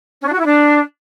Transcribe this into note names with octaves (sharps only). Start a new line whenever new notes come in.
C#4
D4
F#4
E4
D4